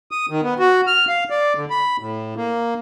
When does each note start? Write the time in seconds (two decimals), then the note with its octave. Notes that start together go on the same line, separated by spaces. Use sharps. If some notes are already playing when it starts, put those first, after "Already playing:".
0.11 D#6
0.29 D#3
0.43 B3
0.59 F#4
0.87 F6
1.08 F5
1.30 D5
1.56 D3
1.70 B5
1.99 A2
2.37 A#3